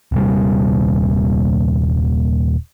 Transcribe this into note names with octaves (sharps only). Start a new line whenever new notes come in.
D#1 C3 G3